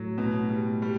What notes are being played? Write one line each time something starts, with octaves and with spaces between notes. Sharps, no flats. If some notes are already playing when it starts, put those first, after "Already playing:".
Already playing: A2 F#3
B2
G3
G3